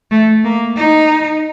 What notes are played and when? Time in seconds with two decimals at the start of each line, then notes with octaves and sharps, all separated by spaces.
0.11 A3
0.44 A#3
0.77 D#4